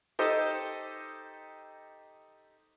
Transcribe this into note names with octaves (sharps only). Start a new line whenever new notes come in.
D#4 G4 A4 C5 D#5